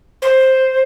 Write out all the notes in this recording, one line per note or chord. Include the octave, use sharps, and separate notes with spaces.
C5